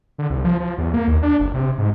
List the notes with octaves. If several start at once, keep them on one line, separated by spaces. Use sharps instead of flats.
D3
C2
F3
F3
E2
A#3
D#2
D4
F#1
C3
G#2